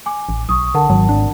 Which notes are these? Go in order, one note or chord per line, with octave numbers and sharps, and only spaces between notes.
G#5 D6
A1
B1 C#6 D#6
D3 A#4 F#5 A5
G#1 F#3
D4